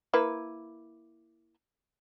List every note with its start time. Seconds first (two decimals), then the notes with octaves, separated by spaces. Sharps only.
0.14 A#3 E4 B4